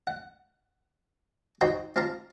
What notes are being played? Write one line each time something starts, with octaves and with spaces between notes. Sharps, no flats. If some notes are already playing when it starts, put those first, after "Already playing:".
F#5
D#4 F#4 C5 G5 A#5 C6
C4 F4 F5 A5 A#5